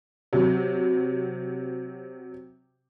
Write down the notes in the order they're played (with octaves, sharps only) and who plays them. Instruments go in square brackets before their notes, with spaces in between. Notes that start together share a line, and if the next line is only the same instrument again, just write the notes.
[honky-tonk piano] C3 F#3